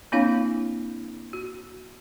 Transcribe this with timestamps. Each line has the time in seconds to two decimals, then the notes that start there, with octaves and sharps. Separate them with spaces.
0.12 A#3 C4 D4 E4 C#5 F5
1.33 F#4